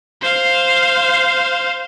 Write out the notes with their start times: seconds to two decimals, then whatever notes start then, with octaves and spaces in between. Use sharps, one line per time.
0.22 C5 F5